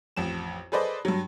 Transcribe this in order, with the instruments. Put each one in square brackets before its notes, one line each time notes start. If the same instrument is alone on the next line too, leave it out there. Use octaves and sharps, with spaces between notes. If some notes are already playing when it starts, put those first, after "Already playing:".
[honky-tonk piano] A1 F2 E7
G#4 A4 B4 C5 D5 D#5
G2 F#3